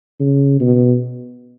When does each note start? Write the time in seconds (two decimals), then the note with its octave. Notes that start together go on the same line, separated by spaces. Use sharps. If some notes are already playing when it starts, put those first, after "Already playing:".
0.20 C#3
0.60 B2